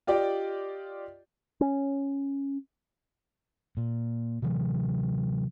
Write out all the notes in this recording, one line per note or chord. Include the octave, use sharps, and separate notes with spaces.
F4 G4 D5 D#5 G5
C#4
A#2
C3 E3 F#3